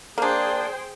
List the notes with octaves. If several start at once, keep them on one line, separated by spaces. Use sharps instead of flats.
A#3 D4 G#4 C5 G5